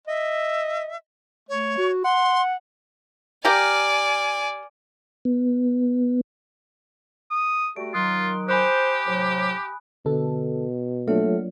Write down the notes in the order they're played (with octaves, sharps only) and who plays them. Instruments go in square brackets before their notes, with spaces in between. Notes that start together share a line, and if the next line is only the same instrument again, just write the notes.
[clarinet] D#5 [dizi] E5
[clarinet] A3 [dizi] C#5
[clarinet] F#4
[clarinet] F#5 [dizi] C6
[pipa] G4 A#4 [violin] D5 G#5
[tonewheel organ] B3
[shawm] D#6
[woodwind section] G3 A3 F#4 [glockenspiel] D7
[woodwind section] D#3 F#3 [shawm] F4 [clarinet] C6 [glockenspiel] D#6 F#6
[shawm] G4 [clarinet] C5 [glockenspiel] G#5 B5 F#6
[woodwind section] A2 C3 F#3 [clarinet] C5
[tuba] B2 [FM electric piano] D3 A4
[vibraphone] F#3 F4 C#5 [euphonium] A3 [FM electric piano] A#3 D4